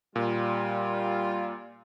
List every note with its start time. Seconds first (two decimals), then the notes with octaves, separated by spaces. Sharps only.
0.16 A#2 G3 F4